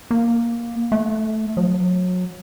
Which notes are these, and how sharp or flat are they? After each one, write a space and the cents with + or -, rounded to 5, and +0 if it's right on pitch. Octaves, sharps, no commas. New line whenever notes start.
A#3 +10
A3 -10
F#3 -30